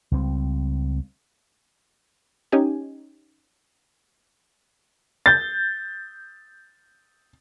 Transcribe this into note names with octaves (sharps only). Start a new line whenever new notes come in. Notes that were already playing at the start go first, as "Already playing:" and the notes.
C#2 G3 C4
C#4 D#4 G4 G#5
G6 A6